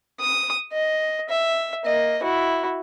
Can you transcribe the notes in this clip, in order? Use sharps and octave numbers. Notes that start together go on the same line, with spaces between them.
D#6
D#5
E5
A#3 D#5
E4 F#4